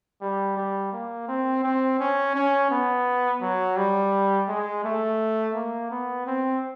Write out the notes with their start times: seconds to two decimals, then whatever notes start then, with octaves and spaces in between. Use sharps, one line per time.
0.21 G3
0.57 G3
0.92 A#3
1.28 C4
1.63 C4
1.99 C#4
2.35 C#4
2.71 B3
3.41 F#3
3.77 G3
4.48 G#3
4.84 A3
5.54 A#3
5.91 B3
6.27 C4